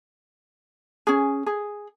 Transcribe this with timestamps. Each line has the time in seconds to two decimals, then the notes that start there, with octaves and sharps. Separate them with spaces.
1.07 C#4 G#4
1.46 G#4